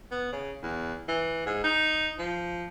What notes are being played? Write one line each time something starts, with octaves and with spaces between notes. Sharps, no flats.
B3
C#3
E2
E3
G#2
D#4
F3